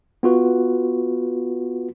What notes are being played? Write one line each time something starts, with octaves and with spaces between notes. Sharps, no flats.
B3 F4 F#4 B4